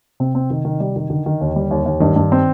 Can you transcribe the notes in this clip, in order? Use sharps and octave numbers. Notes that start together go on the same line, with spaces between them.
C3 C4
C4
D#3
D#3
G3
D#3
D3 D#3
D#3
D#2
G3
D#2
D#2
G2 D#3
G2
C4